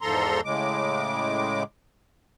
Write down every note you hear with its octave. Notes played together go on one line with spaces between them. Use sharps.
E2 G#2 F3 A4 A#5 C6
A2 C#3 G#3 D6